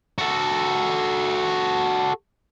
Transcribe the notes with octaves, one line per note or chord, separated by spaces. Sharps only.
F#4 A4